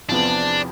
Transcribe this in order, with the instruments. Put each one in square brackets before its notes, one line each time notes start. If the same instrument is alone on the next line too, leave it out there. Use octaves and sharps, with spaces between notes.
[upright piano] E2 C3 F3 B3 [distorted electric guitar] D4